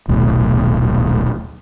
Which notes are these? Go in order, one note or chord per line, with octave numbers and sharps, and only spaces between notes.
D#1 B1 A2